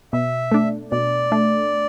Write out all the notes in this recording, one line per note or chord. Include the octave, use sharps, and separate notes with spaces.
B2 E5
A3 D4
B2 D5
A3 D4